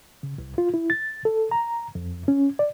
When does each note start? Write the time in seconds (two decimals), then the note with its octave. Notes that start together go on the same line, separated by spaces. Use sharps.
0.23 C#3
0.38 C2
0.58 F4
0.74 E4
0.90 A6
1.25 A4
1.51 A#5
1.95 F2
2.28 C#4
2.59 D5